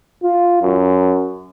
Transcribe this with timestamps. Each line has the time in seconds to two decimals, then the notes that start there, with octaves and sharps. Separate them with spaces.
0.23 F4
0.62 F#2